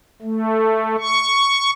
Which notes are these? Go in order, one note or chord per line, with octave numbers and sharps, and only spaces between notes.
A3
C#6